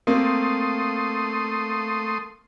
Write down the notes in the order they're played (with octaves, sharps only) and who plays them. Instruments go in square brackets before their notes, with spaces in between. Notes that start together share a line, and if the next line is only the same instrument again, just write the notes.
[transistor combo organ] A3 C6 D#6 [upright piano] A#3 C4